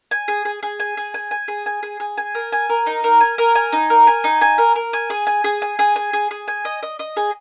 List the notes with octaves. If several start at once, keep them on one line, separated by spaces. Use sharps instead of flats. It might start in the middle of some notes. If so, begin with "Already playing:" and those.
G#5
G#4
G#4
G#4
G#5
G#4
G#5
G#5
G#4
G#5
G#4
G#4
G#5
A#4
G#5
A#4
D#4
A#4
G#5
A#4
G#5
D#4
A#4
G#5
D#4
G#5
A#4
A#4
G#5
G#4
G#5
G#4
G#5
G#4
G#5
G#4
G#4
G#5
D#5
D#5
D#5
G#4